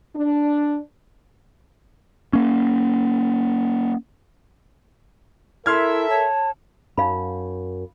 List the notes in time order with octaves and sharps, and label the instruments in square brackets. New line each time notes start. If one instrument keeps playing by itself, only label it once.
[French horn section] D4
[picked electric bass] A#3 C#4
[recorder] E4 [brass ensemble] A4 A#4 E5 [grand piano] C6 F6 G#6
[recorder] C#5 [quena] A5
[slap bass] F#2 [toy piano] D#4 F5 B5